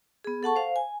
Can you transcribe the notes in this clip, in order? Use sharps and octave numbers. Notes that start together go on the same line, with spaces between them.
B3 G#4
A4 F#5 A5 C#6
C5 F5
G#5